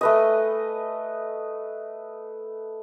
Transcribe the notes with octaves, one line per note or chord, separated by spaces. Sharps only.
A3 B4 D#5